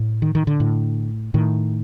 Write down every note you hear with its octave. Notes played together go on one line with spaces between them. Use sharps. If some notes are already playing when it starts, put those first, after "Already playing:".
Already playing: A2
D#3
D#3
D3
A2
A2 D#3